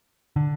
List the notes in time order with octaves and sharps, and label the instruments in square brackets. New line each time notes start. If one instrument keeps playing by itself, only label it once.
[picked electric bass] D3